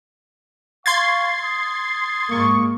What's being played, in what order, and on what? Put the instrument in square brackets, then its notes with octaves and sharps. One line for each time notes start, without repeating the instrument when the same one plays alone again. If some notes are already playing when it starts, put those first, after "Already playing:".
[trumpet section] F5 C#6 [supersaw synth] C6 G#6 A6 [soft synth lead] C7
[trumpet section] D#6
[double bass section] G#2 G#3 A#3 [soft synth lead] C#6